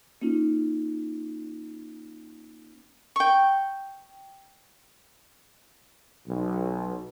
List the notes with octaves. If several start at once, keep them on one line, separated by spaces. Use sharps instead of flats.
A#3 C#4 D#4 F4
G5 C#6
B1